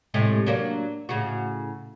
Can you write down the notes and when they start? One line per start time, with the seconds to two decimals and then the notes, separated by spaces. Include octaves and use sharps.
0.14 A2 C3 G#3
0.46 F#3 A#3 D4
1.09 A2 C#3 F#4